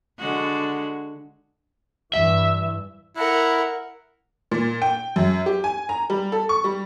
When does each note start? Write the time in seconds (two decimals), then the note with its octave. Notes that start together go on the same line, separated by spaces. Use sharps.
0.19 D3 G#3 F#4
2.14 G2 E3 E5
3.17 E4 A#4 F#5
4.51 A#2
4.82 G5
5.16 F#2
5.46 G4
5.64 G#5
5.89 A#5
6.10 G3
6.32 A4
6.49 C#6
6.64 G3